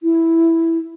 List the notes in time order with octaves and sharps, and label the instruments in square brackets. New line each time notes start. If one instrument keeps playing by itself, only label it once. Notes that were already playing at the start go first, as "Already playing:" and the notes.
[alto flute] E4